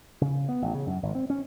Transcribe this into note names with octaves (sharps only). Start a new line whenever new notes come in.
C#3
B3
A1
C#3
F#2
G#1
C4
C#4